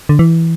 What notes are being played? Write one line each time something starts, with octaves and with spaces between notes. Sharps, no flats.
D3
E3